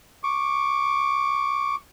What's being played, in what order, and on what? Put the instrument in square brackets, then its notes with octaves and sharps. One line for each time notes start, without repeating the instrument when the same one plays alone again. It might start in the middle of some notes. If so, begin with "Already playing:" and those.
[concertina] C#6 D6